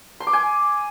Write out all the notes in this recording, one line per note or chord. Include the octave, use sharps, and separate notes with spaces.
C6
D6
G#5